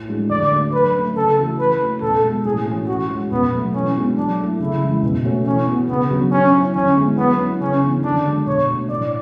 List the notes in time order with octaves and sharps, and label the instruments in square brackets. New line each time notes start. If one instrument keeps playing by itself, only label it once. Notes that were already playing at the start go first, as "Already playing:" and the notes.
Already playing: [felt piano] A2
G#3 D4 F#4
[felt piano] D3 [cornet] D5
[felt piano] A3 D4 F#4
[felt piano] F#3 [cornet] B4
[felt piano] A3 C#4
[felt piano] C#3 [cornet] A4
[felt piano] E3 A3 C#4 F#4
[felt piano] E3 [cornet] B4
[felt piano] A3 C#4 F#4
[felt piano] B2 [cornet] A4
[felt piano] G#3 B3 F#4
[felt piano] A2 [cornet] G#4
[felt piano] E3 A3 C#4 F#4
[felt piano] E3 [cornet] F#4
[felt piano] G#3 C#4 F#4
[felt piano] B2 [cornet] B3
[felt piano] F#3 A3
[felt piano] E3 [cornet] C#4
[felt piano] G#3 B3 D4 F#4
[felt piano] F#3 [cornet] D4
[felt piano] A3 E4
[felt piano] C#3 [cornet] E4
[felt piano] E3 G#3
B2
A3 C#4 F#4
[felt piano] E3 [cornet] C#4
[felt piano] B3 F#4
[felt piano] C#3 [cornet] B3
[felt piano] F#3 B3 D4 F#4
[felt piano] F#3 [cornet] C#4
[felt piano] C#4 E4
[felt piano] D3 [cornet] C#4
[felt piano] G#3 B3 E4
[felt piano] F#3 [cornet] B3
[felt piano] C#4 E4
[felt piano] C#3 [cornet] C#4
[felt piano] E3 B3 D4
[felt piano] D3 [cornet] D4
[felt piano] G#3 D4 F#4
[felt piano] B2 [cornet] C#5
[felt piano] A3 D4 F#4
[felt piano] A2 [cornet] D5